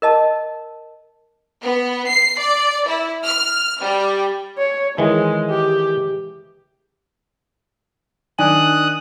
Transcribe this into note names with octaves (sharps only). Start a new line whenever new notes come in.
A#4 D#5 A5
B3
C7
D5
E4
F6
G3
C#5
D#3 E3 G#3
G4
D#3 D4 G#5 D#6 F#6